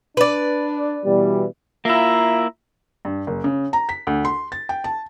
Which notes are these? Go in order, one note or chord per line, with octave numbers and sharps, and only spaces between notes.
D4 B4 D5
B2 E3 G3
A#3 E4 F4 E5 A#5
G2
F#1
C#3
A#5
B6
D2
C6
A6
G5
A5